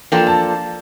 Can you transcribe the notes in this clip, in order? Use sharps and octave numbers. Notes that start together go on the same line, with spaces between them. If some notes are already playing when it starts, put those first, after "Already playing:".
F3 A#3 D4 F4 A4 G5
A5